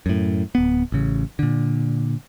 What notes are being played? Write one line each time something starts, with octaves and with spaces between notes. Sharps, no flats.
F#2 A2
D1 B3
A1 C#3
A#2 D3